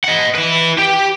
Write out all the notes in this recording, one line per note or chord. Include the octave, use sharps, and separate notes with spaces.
D#5 F#5
E4 B4
G4 G5